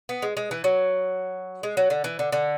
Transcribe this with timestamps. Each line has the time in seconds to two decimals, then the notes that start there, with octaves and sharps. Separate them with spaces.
0.09 B3
0.22 G#3
0.37 G#3
0.51 E3
0.64 F#3
1.63 G#3
1.77 F#3
1.90 D3
2.04 E3
2.19 D3
2.32 D3